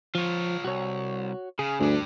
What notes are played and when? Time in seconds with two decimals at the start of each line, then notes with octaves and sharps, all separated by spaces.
0.15 F3 F4 C#5
0.65 C2 F#4 C#5
1.59 C#3 G#4
1.80 D2 G2 D4